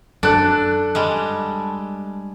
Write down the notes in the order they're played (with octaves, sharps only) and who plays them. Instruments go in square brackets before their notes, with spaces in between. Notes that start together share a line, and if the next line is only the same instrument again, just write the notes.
[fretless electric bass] F#2 [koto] D4 [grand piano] A4 F#6
[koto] G3 G#3